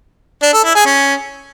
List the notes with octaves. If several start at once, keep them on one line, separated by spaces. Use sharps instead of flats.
D4
A4
E4
G#4
C#4